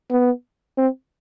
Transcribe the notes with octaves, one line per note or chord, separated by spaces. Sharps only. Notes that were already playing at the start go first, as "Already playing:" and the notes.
B3
C4